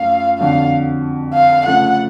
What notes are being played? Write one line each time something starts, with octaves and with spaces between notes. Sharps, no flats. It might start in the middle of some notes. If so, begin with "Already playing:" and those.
Already playing: F#2 F3 A3 F5
F2 D3 F#3 F5
F5
C#3 F3 A3 F#5